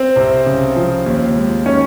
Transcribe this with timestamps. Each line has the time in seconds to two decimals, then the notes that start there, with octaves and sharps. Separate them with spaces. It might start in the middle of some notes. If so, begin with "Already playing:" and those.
Already playing: C4 C5
0.16 C2
0.46 C#3
0.76 F3
1.06 D#2
1.36 G#3
1.66 D#3 C#4 C#5